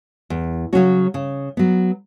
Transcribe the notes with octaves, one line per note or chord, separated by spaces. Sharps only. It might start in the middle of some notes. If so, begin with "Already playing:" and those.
E2
C#3 F#3 C#4 F#4
C#3
F#3 B3